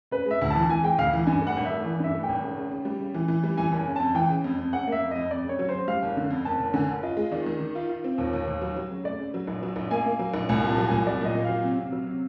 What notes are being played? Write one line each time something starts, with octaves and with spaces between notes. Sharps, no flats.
C#3 B4
G#3 E5
D2
E3 A5
E3 G#5
G#3 G5
D2 F5
E3
G2 G#5
A3
F#5
G#1
E5
A3
E3
G2 E5
A3
G5
G#1
C#3
C#3
C#3
G3
C#3
E3
E3
G3
E3 G#5
F#1 G#5
C#3
F2 A5
E3 G5
C#3
F2
F2
C#3 F#5
A#3 E5
F2
F2 D#5
F2 D5
C#3 C#5
F#3
C5
C#3
G3 F5
F#1
D3
F2
F#1 A5
F#1
D3 G#5
F#1
F4 D#5
G#3
D#3 D5
D#3
D#3
F4
F4
C4
D#2
D#2
D#2
F#3
F#3
C#3
A3 D5
C#3
F#3
A#1
F#3
A#1
A#3 G#5
A#3
F#3
A#1
C2 G#5
A#2
A5
F#3
C2 G#5
F#3 D5
A#2 D#5
A#2
F#3 F5
C3
C3
F#3
C3